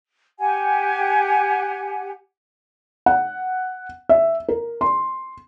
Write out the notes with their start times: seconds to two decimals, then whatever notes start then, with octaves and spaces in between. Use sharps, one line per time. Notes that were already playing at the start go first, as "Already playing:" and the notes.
0.39 G4 F#5 G#5
3.06 F#5
4.09 E5
4.49 A#4
4.81 C6